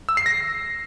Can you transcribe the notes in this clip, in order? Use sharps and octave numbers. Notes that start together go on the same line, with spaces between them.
E6
C7
A#6